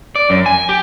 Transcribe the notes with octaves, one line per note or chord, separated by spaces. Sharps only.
D5
F#2
G#5
G4